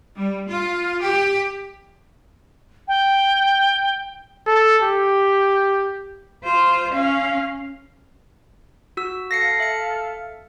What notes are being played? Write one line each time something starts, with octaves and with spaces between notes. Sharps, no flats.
G3
F4
G4
G5
A4
G4
F4 C5
C#4 F5
F#4 E6
A4 F5 A#6 C7 C#7
E5 C#7